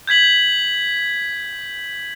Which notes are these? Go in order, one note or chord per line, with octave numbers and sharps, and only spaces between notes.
G6 G#6 B6 F#7